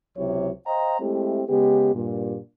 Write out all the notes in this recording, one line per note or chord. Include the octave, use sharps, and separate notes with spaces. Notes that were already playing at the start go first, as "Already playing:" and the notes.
C#2 C3 F#3 E4 C#5
C5 D#5 F5 G5 A#5
G#3 A3 C4 E4 G4
C#3 G#3 B3 G4
G2 A#2